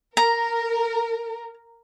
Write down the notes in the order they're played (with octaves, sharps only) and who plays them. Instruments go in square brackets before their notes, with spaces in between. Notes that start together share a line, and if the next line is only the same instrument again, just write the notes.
[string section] A#4 [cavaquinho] A#5